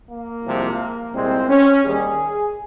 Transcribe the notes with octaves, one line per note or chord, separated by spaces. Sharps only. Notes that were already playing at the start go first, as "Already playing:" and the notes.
A#3
C2 C3 F3 G#3
C2 A#2 G#3 C4
C#4
D#2 D#3 G3 G#4